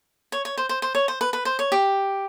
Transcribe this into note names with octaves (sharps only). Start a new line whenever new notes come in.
C#5
C#5
C5
C5
C5
C#5
C5
B4
B4
C5
C#5
G4